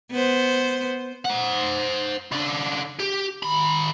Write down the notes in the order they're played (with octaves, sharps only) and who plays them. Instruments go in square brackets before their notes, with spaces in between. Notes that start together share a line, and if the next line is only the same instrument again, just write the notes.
[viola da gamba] B3 C5
[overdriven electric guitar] C5 F#5
C#3 D4
G4
D#3 B5